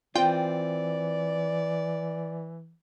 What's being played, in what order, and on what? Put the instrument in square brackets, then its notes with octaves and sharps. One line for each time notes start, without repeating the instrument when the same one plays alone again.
[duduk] E3 [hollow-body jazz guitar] C4 F4 [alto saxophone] D5 [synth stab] G5